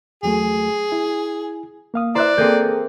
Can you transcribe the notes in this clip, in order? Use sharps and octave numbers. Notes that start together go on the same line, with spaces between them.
E2 F#3 A3 G#4
E4
A#3 F5 D#6
E4 C5 D5 E5 A#5 F#6
A#3 C4 G#4 A4 G5 G6